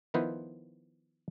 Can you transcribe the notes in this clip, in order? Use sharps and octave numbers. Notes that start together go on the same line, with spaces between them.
D#3 F3 B3 E4 B4 C5